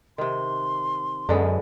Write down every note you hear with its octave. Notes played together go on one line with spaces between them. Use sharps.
C3 D#3 C6
F#2 D3 G#3 B3